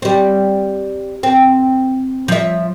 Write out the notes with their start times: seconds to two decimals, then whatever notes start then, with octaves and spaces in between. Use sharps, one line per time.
0.02 G3 C4
1.23 C4
2.28 F3 E5